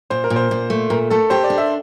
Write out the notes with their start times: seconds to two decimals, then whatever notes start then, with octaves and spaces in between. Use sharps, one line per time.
0.10 A#2 C5
0.24 A#4
0.30 A#2
0.36 C5
0.51 A#2
0.70 A3
0.90 A#2 A#4
1.10 A3 A4
1.30 G4 C5
1.44 D5
1.50 D4
1.58 E5